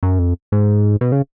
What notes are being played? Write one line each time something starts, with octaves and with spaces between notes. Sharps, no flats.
F#2
F2
G#2
B2
C#3